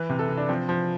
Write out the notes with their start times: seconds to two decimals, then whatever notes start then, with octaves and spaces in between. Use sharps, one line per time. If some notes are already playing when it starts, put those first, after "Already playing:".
Already playing: E3 B4
0.10 C3
0.19 A4
0.29 C3
0.38 D4
0.49 F3 C4
0.69 F3